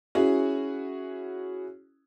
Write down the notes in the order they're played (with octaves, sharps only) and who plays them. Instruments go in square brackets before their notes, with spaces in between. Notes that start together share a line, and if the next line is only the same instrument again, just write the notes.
[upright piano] C#4 E4 F#4 G#4